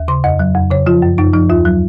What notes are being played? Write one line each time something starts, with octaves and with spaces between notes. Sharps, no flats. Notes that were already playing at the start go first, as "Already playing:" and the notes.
Already playing: D#2
C#3 C6
F2 D#5
F#3
F2
C#3 C#5
F3 F4
F#2
F#2 D#4
F3 D#4
D#2 F4
F#3